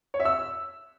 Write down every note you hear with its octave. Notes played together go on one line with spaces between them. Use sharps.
C#5
E5
E6